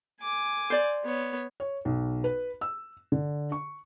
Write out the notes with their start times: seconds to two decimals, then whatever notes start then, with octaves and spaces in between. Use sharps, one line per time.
0.22 G#5 D6
0.70 C5 D5
1.04 B3 C#5
1.60 C#5
1.85 B1
2.24 B4
2.61 E6
3.12 D3
3.52 C#6